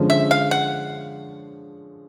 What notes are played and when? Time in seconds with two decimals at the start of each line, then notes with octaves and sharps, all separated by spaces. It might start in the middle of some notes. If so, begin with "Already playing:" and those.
Already playing: D3 F3 G#3 C#4
0.10 E5
0.31 F5
0.51 F#5